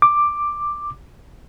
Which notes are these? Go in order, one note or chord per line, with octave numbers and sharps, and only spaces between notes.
D6